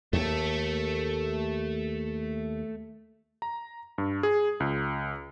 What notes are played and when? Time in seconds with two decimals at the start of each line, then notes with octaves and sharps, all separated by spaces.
0.13 D#2 A3 A4
3.42 A#5
3.98 G2
4.23 G#4
4.60 C#2